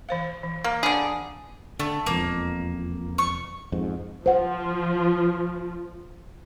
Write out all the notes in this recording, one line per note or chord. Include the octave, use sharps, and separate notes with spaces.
E3 C5 F5
E3
A#3 A#5 D6
D3 D4 G#4
D3 A3
E1 F2 A#3
C#6
F2 G#2
F3 C5 F#5